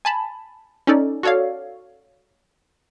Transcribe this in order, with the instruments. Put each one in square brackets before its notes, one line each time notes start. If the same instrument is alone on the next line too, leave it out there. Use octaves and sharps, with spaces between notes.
[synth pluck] G#5 A5 B5
C#4 D#4 A4 D5
F#4 A4 C#5 D5 F5